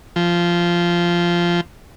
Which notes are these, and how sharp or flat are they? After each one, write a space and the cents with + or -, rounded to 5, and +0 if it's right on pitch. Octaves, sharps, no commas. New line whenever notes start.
F3 -10